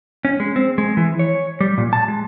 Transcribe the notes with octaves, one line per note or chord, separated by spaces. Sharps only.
C#4
G#3
C4
G#3
E3
C#5
G3
A#2
A5
G#3